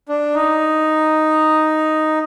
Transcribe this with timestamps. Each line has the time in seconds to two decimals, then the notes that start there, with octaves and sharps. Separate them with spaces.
0.09 D4
0.34 D#4